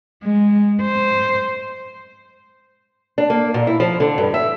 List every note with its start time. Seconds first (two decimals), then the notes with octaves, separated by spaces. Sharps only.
0.24 G#3
0.83 C5
3.18 D4
3.30 A#3
3.54 A#2
3.67 E4
3.80 F3
4.00 D3
4.18 G2
4.34 E5